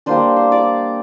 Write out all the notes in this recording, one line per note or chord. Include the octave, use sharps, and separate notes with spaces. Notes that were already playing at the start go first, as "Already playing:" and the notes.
G3 A#3 D4 C5 C6
C5 C6
D5 D6